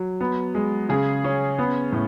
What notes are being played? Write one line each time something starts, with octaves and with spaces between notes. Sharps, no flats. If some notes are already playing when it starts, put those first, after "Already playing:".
Already playing: F#3
B3
G#3
C#3 G#4
C#4
B3
A2